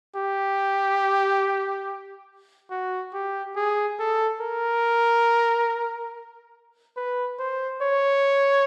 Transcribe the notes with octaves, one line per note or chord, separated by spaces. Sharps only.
G4
F#4
G4
G#4
A4
A#4
B4
C5
C#5